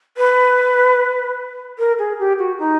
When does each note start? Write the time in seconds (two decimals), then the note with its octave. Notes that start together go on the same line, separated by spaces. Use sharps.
0.17 B4
1.78 A#4
1.98 G#4
2.19 G4
2.38 F#4
2.59 D#4